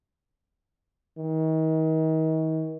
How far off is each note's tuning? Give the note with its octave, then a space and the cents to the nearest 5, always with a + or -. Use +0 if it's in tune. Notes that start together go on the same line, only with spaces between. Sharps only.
D#3 +40